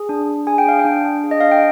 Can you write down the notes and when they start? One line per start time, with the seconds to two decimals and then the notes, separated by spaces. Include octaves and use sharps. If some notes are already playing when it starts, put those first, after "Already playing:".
Already playing: G#4
0.09 D4
0.29 D4
0.47 G#4 G#5
0.58 G5
0.66 D4 F5
0.79 G5
0.85 D4
1.04 D4
1.24 G#4
1.31 D#5
1.41 D4 F5
1.51 G5